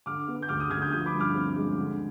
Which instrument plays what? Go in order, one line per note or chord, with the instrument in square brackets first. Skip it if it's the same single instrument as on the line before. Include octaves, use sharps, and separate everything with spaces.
[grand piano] D3 D6 F6
B3
G6
D2 D6 F6
D#6 G6
D2 F6 G#6
D#6 G6
F3 D#6 G6
B5 D6
G2
D6 F6
C4
G#3
D3